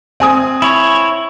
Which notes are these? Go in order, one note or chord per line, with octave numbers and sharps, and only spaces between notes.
C4 G#5 D#6
E4 C#5